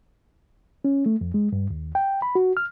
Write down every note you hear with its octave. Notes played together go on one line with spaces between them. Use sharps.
C#4
A3
F2
G#3
G2
D#2
G5
B5
F#4
F6